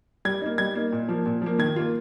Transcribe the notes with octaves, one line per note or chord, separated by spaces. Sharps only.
G3 G#6
A#3 D#4
G3 G#6
A#3 D#4
A#2
F3 A#3
A#2
F3 A#3
D#3 G#6
A#3 F4